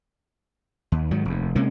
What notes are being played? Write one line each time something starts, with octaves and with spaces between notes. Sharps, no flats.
D#2
G#2 D#3 F#3
F1 D#2
C3 G#3 A#3 C#4